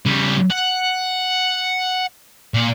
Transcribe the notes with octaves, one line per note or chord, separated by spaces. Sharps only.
C#3 G3
F#5
A#2